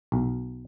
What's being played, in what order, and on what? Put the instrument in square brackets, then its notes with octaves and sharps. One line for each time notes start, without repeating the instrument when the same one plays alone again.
[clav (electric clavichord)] B1